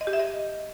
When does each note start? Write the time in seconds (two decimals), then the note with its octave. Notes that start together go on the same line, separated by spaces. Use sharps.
0.01 D#5
0.07 G4
0.13 E5
0.19 D#5